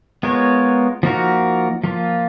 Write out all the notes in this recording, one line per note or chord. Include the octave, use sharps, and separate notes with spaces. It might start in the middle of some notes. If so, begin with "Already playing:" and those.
G#3 B3 F4 A#4 C#5
F3 A#3 D#4 F#4 A#4
F3 A#3 F4